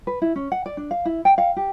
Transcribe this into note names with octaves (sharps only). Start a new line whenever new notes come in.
B4
E4
C#4
F#5
D5
D4
F5
E4
G5
F5
G4